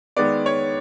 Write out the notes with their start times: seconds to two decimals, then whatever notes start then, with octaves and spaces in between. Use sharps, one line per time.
0.16 D#3 G#3 B3 D5
0.46 C#5